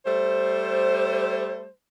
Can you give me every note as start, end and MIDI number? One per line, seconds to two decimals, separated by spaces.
0.06 1.68 55
0.06 1.68 57
0.06 1.68 72